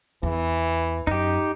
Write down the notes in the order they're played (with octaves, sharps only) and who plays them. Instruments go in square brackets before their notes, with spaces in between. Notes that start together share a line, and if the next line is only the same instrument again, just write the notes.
[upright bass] E2 [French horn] E3
[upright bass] F#2 [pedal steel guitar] D#4 G4